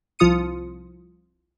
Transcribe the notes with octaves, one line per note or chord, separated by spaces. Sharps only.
C2 F3 F4 D#6 C#7 D#7